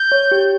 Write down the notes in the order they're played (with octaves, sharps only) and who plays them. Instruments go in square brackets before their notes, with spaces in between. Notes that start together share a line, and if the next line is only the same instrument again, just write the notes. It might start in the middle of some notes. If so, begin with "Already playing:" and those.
Already playing: [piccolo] G6
[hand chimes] C#5
G4